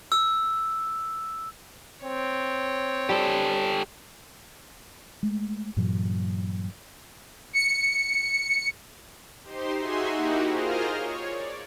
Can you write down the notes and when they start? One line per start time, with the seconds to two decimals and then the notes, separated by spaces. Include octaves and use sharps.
0.12 E6
2.04 C4 C#5
3.09 G3 G4 A4
5.23 G#3 A3
5.77 G2 A#2 E3 F#3
7.53 C#7
9.43 D#4 G4 C5 C6
9.76 D#4 F#4 G#4 E5 G#5 C6
10.13 A#3 D#4 E4 F#4 G4
10.47 F4 G#4 A#4 C5 D#5 F6
10.92 C#5
11.28 D5